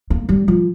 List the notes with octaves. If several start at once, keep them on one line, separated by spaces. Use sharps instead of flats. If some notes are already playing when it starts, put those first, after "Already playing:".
A#3
G3
F3